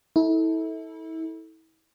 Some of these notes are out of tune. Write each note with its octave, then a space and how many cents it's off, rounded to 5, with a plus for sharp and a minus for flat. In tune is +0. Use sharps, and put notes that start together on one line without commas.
E4 -35 A4 +0